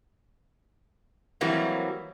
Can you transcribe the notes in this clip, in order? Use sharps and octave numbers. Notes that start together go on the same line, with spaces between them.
E3 F#3 G3 A#3 C4